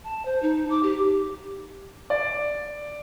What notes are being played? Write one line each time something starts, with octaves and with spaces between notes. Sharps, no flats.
A5
C5
D#4
D6
G4
D5